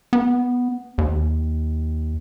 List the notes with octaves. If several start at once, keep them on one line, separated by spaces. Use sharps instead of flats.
B3
D#2